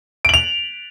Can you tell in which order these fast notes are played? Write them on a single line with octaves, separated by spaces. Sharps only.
D7 F#7 F7